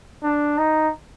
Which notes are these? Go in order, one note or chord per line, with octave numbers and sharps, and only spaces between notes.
D4
D#4